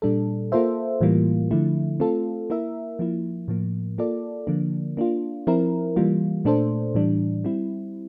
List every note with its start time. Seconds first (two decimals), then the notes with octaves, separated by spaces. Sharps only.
0.02 A#2 G3 D4 A4
0.52 A#3 F4 A4 C5 E5
1.01 A2 E3 G3 A#3 F4
1.51 D3 F3 A3 E4
2.00 A3 C4 F4 A4
2.50 A#3 E4 A#4 E5
2.99 F3 A#3 E4
3.48 A2 F3 A#3
3.98 A#3 F4 A4 D5
4.47 D3 F3 A#3 D4
4.97 A#3 D4 F4
5.47 F3 C4 E4 A#4
5.96 E3 G3 A#3 F4
6.45 A#2 A3 D4 A4 C5
6.95 A2 E3 G3 D4
7.44 G3 C4 E4